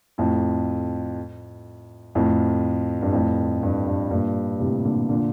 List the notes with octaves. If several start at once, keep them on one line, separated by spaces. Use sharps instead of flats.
F2 A2
F2 A2
G2
F2 A2
G2
G2
G2 A#2
A2 C3
A#2 D3
A#2 D3